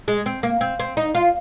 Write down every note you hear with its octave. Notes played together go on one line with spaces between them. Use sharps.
G#3
C4
A#3
C4
C4
D#4
F4